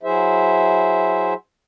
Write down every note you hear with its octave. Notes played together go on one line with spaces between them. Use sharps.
F#3 E4 G#4 C5 E5